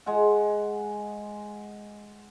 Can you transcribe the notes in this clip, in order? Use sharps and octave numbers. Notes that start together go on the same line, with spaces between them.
G#3 F#5